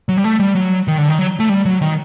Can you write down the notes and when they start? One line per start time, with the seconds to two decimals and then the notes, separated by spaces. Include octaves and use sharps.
0.09 F#3
0.17 G3
0.24 A3
0.40 G3
0.55 F#3
0.88 D#3
0.98 D3
1.09 D#3
1.19 F#3
1.40 A3
1.49 G3
1.66 F#3
1.82 D#3